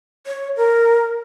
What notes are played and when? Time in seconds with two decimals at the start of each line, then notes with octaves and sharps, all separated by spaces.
0.27 C#5
0.57 A#4